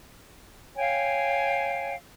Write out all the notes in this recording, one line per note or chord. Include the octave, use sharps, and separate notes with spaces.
C#5 F5 G5 G#5